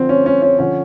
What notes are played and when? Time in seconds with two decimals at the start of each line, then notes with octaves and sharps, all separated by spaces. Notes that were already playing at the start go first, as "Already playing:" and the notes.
Already playing: D3 F3 C4
0.09 C#4
0.26 C#4
0.42 C#4
0.59 D3 F3 C#4